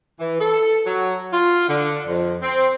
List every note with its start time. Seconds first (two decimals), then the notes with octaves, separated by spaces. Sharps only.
0.20 E3
0.40 A4
0.86 F#3
1.32 F4
1.68 D3
2.07 F2
2.42 C4